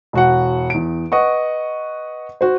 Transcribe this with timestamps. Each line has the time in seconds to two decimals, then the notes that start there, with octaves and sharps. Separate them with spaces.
0.13 E1 F#4 F#5
0.70 E2 D7
1.12 B4 D#5 F#5 C#6
2.41 F#4 C5